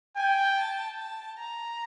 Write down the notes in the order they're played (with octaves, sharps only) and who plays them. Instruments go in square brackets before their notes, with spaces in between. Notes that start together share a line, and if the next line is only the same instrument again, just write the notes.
[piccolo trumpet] G5 [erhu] G#5
[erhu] A5
A5
A#5